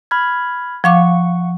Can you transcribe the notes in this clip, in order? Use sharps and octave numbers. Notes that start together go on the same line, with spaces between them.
B5 F6 G#6
F3 F5 F#5 C#6 D6